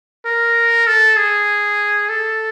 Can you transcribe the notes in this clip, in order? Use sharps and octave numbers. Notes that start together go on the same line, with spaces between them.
A#4
A4
G#4
A4